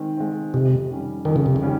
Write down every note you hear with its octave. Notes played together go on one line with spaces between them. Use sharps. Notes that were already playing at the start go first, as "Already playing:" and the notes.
Already playing: D#3 G#3 C4
G#3 C4
F2 C3
D#3 G3 C#4
F2 D#3
C#3
C3
C#3
D#3 G3 C#4